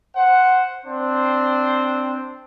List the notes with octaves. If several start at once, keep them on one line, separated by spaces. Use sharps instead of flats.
C5 F#5
C4 D4 C5